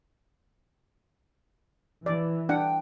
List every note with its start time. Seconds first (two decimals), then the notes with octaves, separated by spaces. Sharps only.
2.06 E3 D5
2.49 D4 F#5 G5